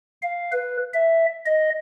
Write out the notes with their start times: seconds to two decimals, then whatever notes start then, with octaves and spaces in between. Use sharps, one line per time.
0.22 F5
0.52 B4
0.93 E5
1.46 D#5